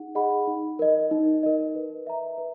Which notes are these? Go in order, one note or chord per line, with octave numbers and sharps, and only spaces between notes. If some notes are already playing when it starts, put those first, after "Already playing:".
Already playing: D#4 G#4 F#5
G#4 D#5 F#5 B5
D#4
A#4 D#5
D#4
A#4 D#5
B4
E5 A#5
B4